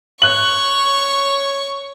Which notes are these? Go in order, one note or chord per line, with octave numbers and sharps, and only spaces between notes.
C#5 C#6 F#6 F#7